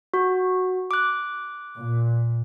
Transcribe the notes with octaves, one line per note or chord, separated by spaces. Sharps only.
F#4
D6 F#6
A#2